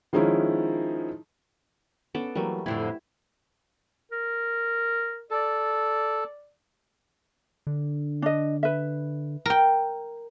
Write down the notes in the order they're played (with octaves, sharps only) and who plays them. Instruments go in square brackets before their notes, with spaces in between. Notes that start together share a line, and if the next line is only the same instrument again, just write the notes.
[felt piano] D#3 F3 G#3 C#4 D#4 E4
[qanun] B3 A4 D5 [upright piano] C#4
[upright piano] E3 F#3 A#3 [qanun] G3 A3
[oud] F2 A2 D3 [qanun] E4 [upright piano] G5
[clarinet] A#4
[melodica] A4 [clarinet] D5
[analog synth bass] D3
[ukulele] D4 D#5
B4 E5
[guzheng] A#4 G5